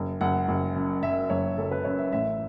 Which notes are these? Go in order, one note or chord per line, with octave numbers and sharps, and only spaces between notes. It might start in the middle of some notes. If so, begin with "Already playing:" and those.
Already playing: F#1
F#1 F#5
F#1
F#2
F#2 E5
F#1 C#5
F#1 A4
B4
F#2 C#5
E5
A1 E5